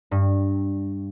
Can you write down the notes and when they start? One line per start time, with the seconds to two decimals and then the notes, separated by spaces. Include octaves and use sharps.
0.11 G2